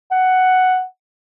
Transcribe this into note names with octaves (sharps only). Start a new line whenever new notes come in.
F#5